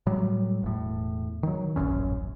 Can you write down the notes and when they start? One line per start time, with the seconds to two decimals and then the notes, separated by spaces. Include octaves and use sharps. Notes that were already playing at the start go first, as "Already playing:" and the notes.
0.06 A2 F#3 G3
0.63 E1 A2
1.43 D#3 F#3
1.76 D#1 A1 F#2 C#4